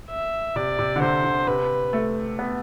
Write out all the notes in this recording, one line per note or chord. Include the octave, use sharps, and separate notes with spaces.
E5
C3 D5
C3
D3
C3 C5
D3
C3 B4
A3
B3